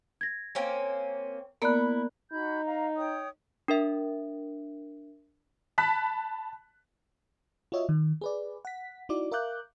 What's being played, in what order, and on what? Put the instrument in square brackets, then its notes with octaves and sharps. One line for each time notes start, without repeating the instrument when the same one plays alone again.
[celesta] G#6 A#6
[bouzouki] A#3 C4 C#4
[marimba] A#3 B3 [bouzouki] E4 [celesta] A#4 D5 F#6
[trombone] D#4 [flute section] F#4 B5 G6
[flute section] F5 A#5
C#5 G5 D#6
[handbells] D4 A#4 E5
[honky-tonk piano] A5 B5 F#6 B6
[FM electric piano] F4 F#4 C#5 D#5 E5
D#3
G#4 B4 D5
F#5 B6
D#4 E4 F#4 D5 D6
A#4 E5 F5 D6 F#6 G6